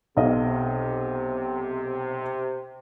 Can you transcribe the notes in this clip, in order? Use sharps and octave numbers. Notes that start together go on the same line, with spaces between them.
B1 C3 D#5 F5